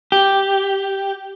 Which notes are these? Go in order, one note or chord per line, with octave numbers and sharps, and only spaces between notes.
G4